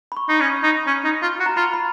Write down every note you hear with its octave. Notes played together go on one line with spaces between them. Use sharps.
B5
C#6
D#4
C#4
D#4
C#4
D#4
F4
F#4
A#5
F4 B5
B5